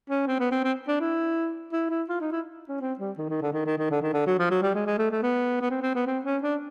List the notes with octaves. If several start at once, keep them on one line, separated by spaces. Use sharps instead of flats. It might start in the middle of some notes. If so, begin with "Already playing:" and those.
C#4
C4
B3
C4
C4
D4
E4
E4
E4
F4
D#4
E4
C#4
C4
G3
D#3
D#3
D3
D#3
D#3
D#3
D3
D#3
D3
F#3
F3
F#3
G3
G#3
G#3
A3
A3
B3
B3
C4
C4
B3
C4
C#4
D4